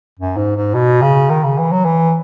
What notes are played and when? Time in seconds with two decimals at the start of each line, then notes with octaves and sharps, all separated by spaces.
0.20 F#2
0.37 G#2
0.56 G#2
0.74 B2
1.02 C#3
1.30 D#3
1.44 C#3
1.58 E3
1.72 F#3
1.85 E3